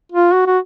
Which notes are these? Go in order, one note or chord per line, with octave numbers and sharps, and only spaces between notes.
F4
F#4
F#4